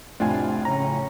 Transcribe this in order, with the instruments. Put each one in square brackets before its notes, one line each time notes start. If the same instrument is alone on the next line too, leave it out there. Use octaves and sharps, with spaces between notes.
[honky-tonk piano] F2 A2 [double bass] C3 [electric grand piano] D4 F4 G#5
[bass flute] C#3 [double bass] C#4 [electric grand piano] A#5